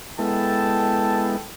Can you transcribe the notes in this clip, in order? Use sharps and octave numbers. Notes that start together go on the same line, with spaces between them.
G#3 B3 E4 A4 G5 A5